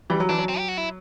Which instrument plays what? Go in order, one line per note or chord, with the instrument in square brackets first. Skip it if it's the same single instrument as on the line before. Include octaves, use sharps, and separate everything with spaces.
[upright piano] E3 G3
F#3
[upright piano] E3 [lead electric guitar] D4
[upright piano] F#3
[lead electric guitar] C4
G4
F#4
E4